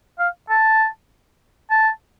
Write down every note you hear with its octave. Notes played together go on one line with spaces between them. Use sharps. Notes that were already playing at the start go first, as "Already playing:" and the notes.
F5
A5
A5